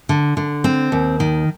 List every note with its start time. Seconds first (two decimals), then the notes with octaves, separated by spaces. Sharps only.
0.09 D3
0.37 D3
0.64 C4
0.92 D#2
1.20 D#3